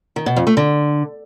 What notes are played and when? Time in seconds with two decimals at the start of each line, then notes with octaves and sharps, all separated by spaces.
0.16 D#3
0.26 B2
0.36 F2
0.47 A3
0.57 D3